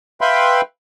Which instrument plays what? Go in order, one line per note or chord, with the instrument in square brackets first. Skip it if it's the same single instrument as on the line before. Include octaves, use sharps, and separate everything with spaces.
[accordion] B4 E5 F5 G5 B5 C6